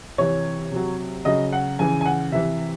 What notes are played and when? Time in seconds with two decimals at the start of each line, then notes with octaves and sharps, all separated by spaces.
0.18 C3 E3 C#5
0.71 C3 F#3
1.25 C#3 F#3 D#5
1.52 F#5
1.79 C#3 E3 G#5
2.01 G#5
2.06 F#5
2.32 C3 E3 E5